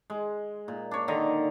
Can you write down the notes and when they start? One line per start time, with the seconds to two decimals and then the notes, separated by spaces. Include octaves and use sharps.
0.10 G#3
0.68 A#2
0.91 D4 C#5
1.08 D3 D#3 D#5 A#5